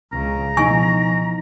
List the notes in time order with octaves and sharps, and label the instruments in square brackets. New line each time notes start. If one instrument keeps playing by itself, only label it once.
[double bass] C#2 C#3 [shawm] A#5
[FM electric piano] B2 E3 D#4 [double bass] F3 [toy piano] G#5 C#6